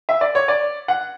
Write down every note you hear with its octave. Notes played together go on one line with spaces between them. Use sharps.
E5
D5
C#5
D5
F#5